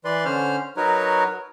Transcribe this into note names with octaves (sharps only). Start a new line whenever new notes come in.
E3 B4 D5 C6
D3 C#4 C5 F6
F#3 D#4 F#4 A#4 B4 C#5